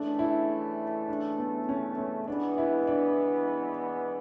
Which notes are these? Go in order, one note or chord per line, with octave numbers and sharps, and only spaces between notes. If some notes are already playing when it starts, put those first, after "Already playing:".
Already playing: C#3 E3 A3 D4
E4
D4
B3
C#4
C#4
E3 G#3 B3 D4
E4
D4